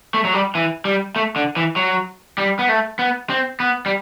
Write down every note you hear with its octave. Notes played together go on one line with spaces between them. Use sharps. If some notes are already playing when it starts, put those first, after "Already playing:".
A3
F#3
G3
E3
G3
A3
D3
E3
F#3
G3
B3
A3
B3
C4
B3
G3